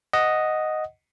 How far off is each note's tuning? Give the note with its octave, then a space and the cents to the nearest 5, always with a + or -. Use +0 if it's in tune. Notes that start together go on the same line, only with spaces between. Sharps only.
D#5 +0 F#5 +0